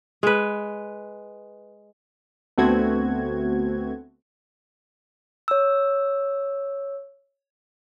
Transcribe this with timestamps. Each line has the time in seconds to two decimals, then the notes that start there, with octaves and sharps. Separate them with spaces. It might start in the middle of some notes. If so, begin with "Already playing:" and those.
0.23 G#3 B4
2.58 D2 A3 B3 C4 F#4 G#6
5.48 C#5 E6